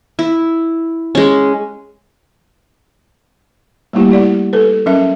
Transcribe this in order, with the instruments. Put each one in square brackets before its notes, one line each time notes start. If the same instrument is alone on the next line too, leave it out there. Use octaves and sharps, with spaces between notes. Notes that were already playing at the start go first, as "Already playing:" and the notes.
[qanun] E4
G#3 C#4
[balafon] G3 A3 A#3 E4 G4
E4 D5 F#5
A4 B4
F#3 C#4 A#4 E5